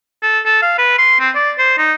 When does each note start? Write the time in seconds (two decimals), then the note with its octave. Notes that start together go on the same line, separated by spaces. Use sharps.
0.23 A4
0.45 A4
0.62 F5
0.78 B4
0.98 C6
1.20 C4
1.35 D5
1.58 C5
1.78 D#4